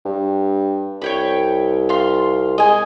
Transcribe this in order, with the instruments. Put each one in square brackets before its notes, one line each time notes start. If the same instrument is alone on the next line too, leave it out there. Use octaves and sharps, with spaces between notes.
[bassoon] G2
[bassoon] C2 [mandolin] C#5 G5 B5
[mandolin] F4 C6
[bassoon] G#3 [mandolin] D#5 G#5